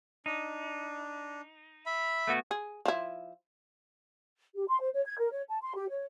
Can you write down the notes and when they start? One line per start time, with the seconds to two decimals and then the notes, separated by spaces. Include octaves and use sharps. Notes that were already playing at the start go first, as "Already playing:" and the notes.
0.26 D4 D#4
1.86 E5 B5
2.27 A3 B3 F#4
2.51 G#4
2.86 F3 E4
4.55 G4
4.69 C6
4.81 C5
4.94 C#5
5.06 G#6
5.19 A#4
5.31 C#5
5.49 A5
5.62 C6
5.75 G4
5.89 C#5